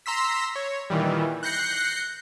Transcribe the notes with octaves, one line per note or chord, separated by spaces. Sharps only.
A#5 C6 E6 B6
C#5
A#2 D#3 E3 G3
F#6 G6 A#6 C7 C#7